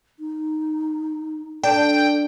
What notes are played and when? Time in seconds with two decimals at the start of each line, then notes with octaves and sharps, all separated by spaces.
0.19 D#4
1.64 D4 A4 G5